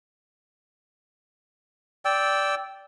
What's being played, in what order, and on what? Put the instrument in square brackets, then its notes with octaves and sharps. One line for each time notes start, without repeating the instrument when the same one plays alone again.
[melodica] D5 G5 E6